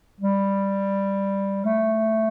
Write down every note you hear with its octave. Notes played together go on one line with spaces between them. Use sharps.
G3
A3